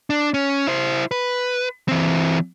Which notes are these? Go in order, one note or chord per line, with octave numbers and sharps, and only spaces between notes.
D4
C#4
E4 C5
B4
E3 C4